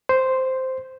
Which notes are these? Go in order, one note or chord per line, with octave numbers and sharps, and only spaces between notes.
C5